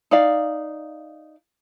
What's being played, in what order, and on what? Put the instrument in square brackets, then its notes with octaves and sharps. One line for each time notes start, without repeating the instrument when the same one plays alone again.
[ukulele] D#4 D5 F5